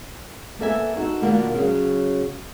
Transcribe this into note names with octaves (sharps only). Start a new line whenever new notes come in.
A#3 B3 A4 E5 G#5
D#4 F#4 A4
B2 D#3 A#3 B3 D4 F4
C#3 F#3